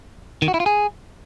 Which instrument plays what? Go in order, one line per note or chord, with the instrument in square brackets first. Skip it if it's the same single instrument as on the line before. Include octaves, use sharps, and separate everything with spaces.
[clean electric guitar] D#3
F#4
E4
F4
G#4